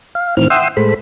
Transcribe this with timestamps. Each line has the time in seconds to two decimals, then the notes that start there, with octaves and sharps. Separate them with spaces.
0.15 F5
0.37 A2 D#3 E3 C4 F6
0.50 E5 F#5 G5 C6 D#6 E6
0.77 A2 G#3 A4 C5 B5